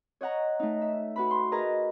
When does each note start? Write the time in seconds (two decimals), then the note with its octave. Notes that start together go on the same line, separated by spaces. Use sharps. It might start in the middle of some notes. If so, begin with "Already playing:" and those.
0.21 C#5 D#5 F#5 A#5
0.60 A3 D#4
0.82 E5
1.16 F#4 B4 B5
1.31 C6
1.52 G#4 A#4 B4 D#5 A#5